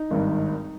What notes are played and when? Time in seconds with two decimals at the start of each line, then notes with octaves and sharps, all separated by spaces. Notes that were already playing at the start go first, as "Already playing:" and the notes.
Already playing: D#4
0.10 G#1 G2 D#3